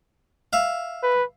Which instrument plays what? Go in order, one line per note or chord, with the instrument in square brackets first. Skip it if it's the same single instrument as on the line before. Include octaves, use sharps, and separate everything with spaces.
[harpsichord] E5 F5
[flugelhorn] B4